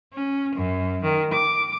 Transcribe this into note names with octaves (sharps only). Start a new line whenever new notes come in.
C#4
F#2
D#3
D6